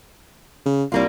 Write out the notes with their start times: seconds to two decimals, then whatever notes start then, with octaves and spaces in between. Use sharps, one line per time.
0.66 C#3
0.92 C2 G3 A#3 F4